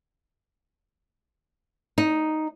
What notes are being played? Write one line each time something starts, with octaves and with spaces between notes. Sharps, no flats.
D#4